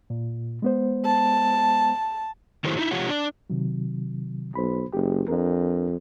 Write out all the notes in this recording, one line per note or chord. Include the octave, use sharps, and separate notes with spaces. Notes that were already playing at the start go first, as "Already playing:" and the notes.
A#2
G#3 B3 C5
A5
D#3 F#3 A3 E4 G4 C5
F#3 D#4 E4
C3 F3 F4 G4 C#5 F#5
D4 D5
C3 D#3 F#3
B1 C5 B5
F#1 G4
F2 D4 A#4